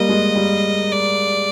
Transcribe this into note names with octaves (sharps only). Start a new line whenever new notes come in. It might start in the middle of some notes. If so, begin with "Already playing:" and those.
Already playing: G3 A#3 D#5
G#3
G3
D5